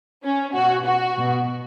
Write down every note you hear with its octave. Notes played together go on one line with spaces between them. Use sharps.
C#4
B2 F#4
F#4
B2